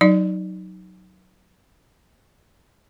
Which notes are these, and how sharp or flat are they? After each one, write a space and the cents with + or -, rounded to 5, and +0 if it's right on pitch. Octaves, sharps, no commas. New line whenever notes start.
F#3 +0 D#4 +0 D5 +0